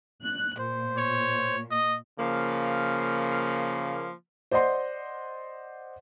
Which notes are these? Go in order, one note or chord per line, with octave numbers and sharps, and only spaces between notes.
F#6
A#2 C5
C#5
D#5
C#3 F3 A#3
C5 D5 D#5 F#5 C6